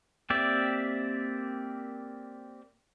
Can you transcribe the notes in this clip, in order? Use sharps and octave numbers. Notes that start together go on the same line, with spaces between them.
A#3 C4 G4 D5 E5